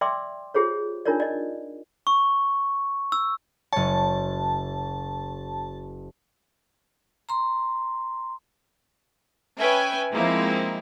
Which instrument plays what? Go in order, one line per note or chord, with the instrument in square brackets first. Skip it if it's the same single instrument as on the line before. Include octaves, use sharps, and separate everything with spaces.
[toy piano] D5 E5 G5 C6 D6 E6
F4 G4 G#4 C5 C#5
D4 D#4 F4 A#4 C#5 D5
D5 D#5
[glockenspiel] C#6
E6
[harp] F#1 C#5 [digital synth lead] A5
[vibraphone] A#5 C6
[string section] C#4 B4 E5 G5 G#5
F3 G#3 A#3 C4 D#4 E4